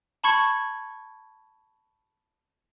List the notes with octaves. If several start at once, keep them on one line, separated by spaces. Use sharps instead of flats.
A5 B5 C#6 G#6 C#7